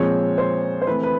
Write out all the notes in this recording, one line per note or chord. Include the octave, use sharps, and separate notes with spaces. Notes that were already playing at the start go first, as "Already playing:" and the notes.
Already playing: A#2 F3 G#3 C4 C#5
C5
C5
E3 A3 C4 B4
B4